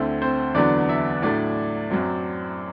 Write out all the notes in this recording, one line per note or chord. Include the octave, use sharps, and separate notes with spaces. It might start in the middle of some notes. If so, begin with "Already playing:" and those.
Already playing: D2 D3 A3 C4 E4
C4 C5
E2 D3 F#3 B3 D4 D5
E4 E5
A2 F#3 A3 D4 D5
F#2 F#3 C4